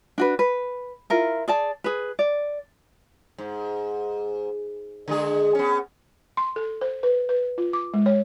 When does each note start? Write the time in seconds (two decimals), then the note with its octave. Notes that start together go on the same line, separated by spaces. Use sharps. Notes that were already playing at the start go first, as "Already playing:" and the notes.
0.18 D4 F#4 B4
0.39 B4
1.10 E4 F4 A#4
1.48 G#4 D5 A5
1.84 G#4 B4
2.19 D5
3.38 G#2
5.08 D3 G#3 G#4
5.55 B3 C#4
6.37 C6
6.56 A4
6.81 C5
7.03 B4
7.29 B4
7.58 F4
7.73 D6
7.94 G#3
8.06 C#5